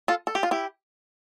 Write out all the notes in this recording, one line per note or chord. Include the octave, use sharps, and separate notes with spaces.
F4 A4
A4
G4
F4
E4 G4